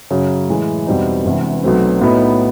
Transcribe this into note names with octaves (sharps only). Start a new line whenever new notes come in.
F#2 C#3 F#3
A2 E3 G#3
E2 B2 G3 C4 D#4
E1 E2 C3
B1 B2 F#3 A3 C4
A2 F#3 B3 D#4